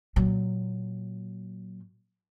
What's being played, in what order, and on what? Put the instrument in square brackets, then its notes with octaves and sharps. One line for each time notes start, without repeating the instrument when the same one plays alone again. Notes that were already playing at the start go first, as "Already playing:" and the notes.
[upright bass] A#2 F#3